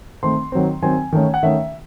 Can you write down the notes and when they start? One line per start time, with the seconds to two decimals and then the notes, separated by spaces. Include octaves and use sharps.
0.23 D#3 A3 C4 C6
0.52 D#3 F#3 C4
0.82 D#3 F#3 C4 G#5
1.13 D#3 A3 C#4
1.34 F#5
1.43 D#3 A3 C#4 E5